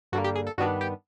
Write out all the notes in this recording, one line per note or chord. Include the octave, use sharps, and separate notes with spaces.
G2 D3 G3 A#3 F#4
G4
G#4
A4
G2 D#3 G3 B3 D4 F#4
G4